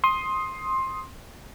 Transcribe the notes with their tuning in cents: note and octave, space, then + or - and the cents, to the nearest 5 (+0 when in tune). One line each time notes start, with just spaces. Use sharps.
C6 +15 D#6 +10